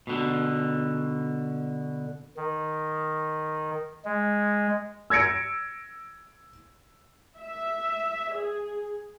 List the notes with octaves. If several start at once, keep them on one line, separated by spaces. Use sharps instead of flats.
B2 D3
D#3
G#3
E6 G#6 A#6 C#7 D7
E5
G#4